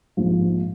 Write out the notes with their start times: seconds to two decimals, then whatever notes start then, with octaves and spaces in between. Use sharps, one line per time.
0.17 A#1 G#2 F3 G#3